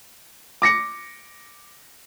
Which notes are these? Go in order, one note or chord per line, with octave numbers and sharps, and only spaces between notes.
D6 A#6 C#7